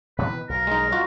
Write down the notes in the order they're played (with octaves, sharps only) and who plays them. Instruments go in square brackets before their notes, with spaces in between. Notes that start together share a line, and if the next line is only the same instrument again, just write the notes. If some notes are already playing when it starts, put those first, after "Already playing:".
[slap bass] B2 D#3 E3 [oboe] B4
[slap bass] B1 [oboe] A#4
[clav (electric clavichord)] G#3 D#4
F4 F#4